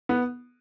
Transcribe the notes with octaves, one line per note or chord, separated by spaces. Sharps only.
B3